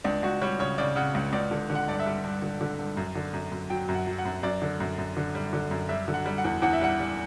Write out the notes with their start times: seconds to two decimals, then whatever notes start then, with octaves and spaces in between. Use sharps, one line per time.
0.04 C#2 D4
0.23 C#2 F#4
0.41 G3 C#5
0.59 C#3 C#5
0.78 C#3 D5
0.96 C#3 F#5
1.15 C#2
1.33 C#2 D5
1.51 D3
1.70 D3
1.75 F#5
1.88 G2 D5
2.00 E5
2.06 G3
2.24 G2
2.42 D3
2.61 D3
2.79 G2
2.97 F#2
3.15 D3
3.33 F#2
3.52 F#2
3.70 F#3 G5
3.88 F#2
3.95 F#5
4.07 F#3
4.18 F#5
4.25 F#2
4.43 F#2 D5
4.62 D3
4.80 F#2
4.98 F#2
5.17 D3
5.35 G3
5.53 D3
5.71 F#2
5.89 G3 E5
6.08 D3
6.14 F#5
6.26 G3
6.38 F#5
6.44 E2
6.62 E2 F#5
6.73 E5
6.81 G3 F#5
6.99 G3